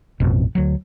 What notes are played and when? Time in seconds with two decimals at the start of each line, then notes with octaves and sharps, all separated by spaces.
0.20 A1 F2 B2
0.55 D2 F#3